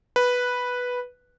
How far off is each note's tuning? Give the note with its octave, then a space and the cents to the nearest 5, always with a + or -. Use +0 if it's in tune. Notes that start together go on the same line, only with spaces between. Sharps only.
B4 -5